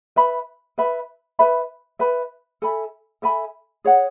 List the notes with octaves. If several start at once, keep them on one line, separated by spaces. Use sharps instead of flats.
B4 E5 B5
B4 E5 B5
B4 E5 B5
B4 E5 B5
A4 E5 G#5 B5
A4 E5 G#5 B5
G#4 C#5 F#5